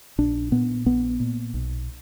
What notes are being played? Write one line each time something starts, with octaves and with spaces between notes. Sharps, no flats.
A#1 D4
A#2 B3
A#1 B3
A#2
B1